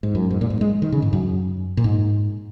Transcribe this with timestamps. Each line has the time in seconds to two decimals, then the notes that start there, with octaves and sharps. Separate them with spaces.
0.03 G#2
0.15 F#2
0.31 G#2
0.41 A#2
0.50 G#2
0.61 G#3
0.82 D#3
0.92 C#3
1.02 G#2
1.13 F#2
1.77 A#2
1.84 G#2